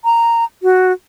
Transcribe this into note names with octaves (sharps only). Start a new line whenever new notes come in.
A#5
F#4